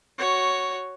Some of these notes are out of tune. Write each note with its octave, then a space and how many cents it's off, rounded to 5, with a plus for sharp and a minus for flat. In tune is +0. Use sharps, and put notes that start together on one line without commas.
F#4 +5 C#5 +0